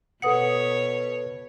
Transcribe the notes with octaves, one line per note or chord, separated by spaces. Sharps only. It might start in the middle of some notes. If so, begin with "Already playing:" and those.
B2 A4 B4 C#5 F#5 D#6 C#7